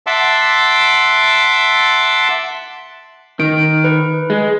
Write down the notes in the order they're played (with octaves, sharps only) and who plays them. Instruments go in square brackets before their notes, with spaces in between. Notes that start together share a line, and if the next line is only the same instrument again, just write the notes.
[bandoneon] E5 F#5 A5 C6 D6 E6
[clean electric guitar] D#3 [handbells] D7
[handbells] B4
[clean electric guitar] G#3